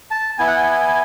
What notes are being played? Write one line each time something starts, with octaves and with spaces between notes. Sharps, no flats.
A5
B3 E4 G#5
F#5
G#5